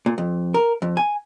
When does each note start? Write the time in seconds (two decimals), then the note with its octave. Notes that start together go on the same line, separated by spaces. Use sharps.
0.06 A#2
0.18 F2
0.54 A#4
0.82 F2
0.97 G#5